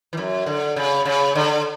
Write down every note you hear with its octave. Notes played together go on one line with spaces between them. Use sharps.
E3
F#2
D3
C#3
C#3
D3